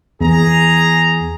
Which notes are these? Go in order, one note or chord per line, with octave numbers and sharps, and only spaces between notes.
E2 G#4 A#5